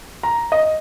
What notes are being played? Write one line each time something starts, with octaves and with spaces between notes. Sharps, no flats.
A#5
D#5